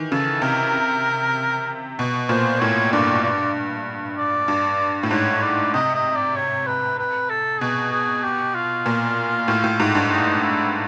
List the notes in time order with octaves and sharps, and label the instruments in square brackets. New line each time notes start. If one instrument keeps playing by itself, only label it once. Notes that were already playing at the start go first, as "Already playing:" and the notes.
Already playing: [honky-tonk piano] D#3 E3
[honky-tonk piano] C#3 [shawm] A4
[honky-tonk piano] C3 [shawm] A#4
[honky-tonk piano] B2
[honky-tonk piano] A#2 [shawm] C5
[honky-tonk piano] A2 [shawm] C#5
[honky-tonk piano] G2 [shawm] D5
[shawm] D5
D5
[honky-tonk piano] G2
A2
[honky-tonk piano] G#2 [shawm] C#5
[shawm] D5
[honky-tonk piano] C3 [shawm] D#5
[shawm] D#5
D5
C#5
B4
B4
A4
[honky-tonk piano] B2 [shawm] G#4
[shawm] G#4
G4
F4
[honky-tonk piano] A#2
A2
A2
G#2
G2
[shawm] D#4
E4